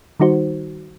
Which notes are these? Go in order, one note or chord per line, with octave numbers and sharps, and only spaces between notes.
D#3 G3 D#4 F#4 C5